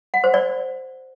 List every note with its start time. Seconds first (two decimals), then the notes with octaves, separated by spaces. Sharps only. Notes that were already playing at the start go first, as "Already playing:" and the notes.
0.14 F#5
0.24 C5
0.34 D5